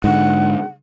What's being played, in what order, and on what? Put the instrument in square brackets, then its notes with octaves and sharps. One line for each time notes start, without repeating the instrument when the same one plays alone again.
[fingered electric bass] G#2 D3 [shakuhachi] F#5